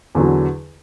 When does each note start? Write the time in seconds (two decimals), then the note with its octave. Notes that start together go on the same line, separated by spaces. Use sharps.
0.15 E2 D3 F#3